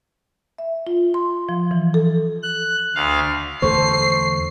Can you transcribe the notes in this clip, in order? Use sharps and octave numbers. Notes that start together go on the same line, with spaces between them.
E5
F4
C6
F3
E3
A4
F#6
D2 F5
E2 D3 A3 A4 C5 C#6 C7